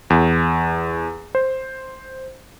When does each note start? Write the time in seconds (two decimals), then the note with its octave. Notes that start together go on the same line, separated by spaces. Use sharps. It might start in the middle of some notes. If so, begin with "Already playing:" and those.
0.10 E2
1.35 C5